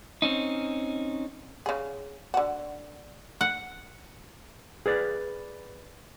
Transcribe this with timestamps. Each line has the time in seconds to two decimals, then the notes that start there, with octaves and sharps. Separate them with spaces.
0.22 C4 C#4 D#4
1.66 C#3 G#4
2.34 D3 F#4
3.41 F#5
4.86 G#4 B4 D5